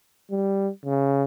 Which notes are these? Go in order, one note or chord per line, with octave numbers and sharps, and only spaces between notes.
G3
C#3